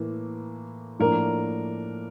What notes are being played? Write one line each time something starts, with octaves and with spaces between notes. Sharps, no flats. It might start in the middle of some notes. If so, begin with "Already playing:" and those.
Already playing: A2 E3 A#3
A2 F3 A#3 D4 A#4